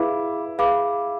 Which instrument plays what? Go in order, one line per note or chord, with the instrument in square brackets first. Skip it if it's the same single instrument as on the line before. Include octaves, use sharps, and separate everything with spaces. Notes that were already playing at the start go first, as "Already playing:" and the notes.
Already playing: [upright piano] E4 [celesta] G#4 B4 F5 B5 D6
[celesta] G#4 B4 F5 B5 D6